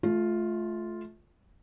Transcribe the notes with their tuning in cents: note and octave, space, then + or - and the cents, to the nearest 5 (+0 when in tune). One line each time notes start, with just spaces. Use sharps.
A3 -30 F4 +0